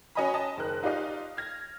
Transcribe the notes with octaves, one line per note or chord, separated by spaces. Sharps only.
C#4 F#4 D#5 G#5 A#5 B5
D#5 A5
F#1 D#3 A#4 F#6
D#4 F4 G4 D5 D#5 F5
F6 G#6 A#6